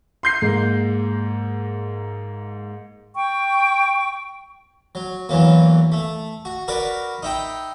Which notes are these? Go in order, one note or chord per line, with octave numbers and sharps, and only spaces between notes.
C6 G6 C7
G#2 G#3 A#3
G5 C#6
F#3
E2 E3 F#3 A#3
A3
F#4
F#4 A#4 B4 D5
D#4 E4 G5